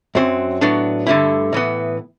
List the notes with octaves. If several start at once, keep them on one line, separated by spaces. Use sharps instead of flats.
F#2 F#3 C4
A2 F#3 B3 D4
G2 D3 A3 E4
A2 E3 B3